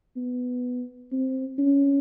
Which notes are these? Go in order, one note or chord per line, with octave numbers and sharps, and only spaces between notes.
B3
C4
C#4